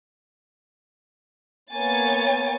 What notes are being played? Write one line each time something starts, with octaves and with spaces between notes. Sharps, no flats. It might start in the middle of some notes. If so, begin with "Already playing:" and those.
A#3 B3 C#5 G#5 A6